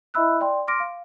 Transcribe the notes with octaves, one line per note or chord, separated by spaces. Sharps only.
E4 D#5 E5 B5 E6 F#6
D5 G5 C6
C6 D6 F6 A#6 D7
F5